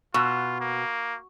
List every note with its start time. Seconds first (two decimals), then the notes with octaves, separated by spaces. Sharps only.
0.14 B2 F4 C#6
0.61 A#3